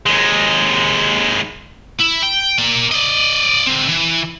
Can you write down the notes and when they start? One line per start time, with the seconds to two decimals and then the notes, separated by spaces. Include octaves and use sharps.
0.06 D#2 G#3
2.00 E4
2.23 G5
2.58 A#3 D5
2.92 D5 D#5
3.67 D3 C4
3.89 E3